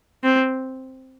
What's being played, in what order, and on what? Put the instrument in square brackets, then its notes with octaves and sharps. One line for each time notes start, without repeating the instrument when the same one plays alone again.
[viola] C4